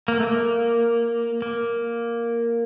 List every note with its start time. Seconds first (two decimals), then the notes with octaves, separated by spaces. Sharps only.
0.08 A#3
0.20 A3
0.27 A#3
1.42 A#3